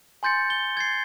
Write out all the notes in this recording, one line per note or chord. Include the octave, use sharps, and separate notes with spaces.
G#5 C6 G6 A6 C#7
G7
G#6 A6 C7